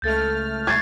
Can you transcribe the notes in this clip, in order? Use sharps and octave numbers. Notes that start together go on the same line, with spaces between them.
C#2 A3 F6 G6 A6
C#6 G#6 A6 C7